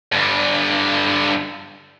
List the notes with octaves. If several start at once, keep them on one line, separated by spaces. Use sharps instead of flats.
G2 D3